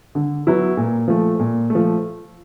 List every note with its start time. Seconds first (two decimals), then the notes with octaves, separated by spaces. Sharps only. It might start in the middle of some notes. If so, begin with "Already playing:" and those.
0.15 D3
0.47 F#3 B3 E4
0.77 A#2
1.08 F3 A3
1.39 A#2
1.70 F3 A3